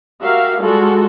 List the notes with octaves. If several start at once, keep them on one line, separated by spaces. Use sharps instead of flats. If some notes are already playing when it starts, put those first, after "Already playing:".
F#4 G4 A#4 E5 F5
G3 G#3 F4 F#4 A4